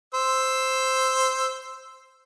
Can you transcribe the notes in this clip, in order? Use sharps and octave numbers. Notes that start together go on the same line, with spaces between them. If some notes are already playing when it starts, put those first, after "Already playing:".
C5 E6